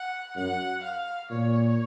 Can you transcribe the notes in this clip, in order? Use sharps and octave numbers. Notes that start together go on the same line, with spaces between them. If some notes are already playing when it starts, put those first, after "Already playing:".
Already playing: F#5
F#2 F#5
F5
A#2 C#5